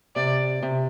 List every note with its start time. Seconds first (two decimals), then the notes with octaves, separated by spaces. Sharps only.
0.16 C3 D5
0.63 C3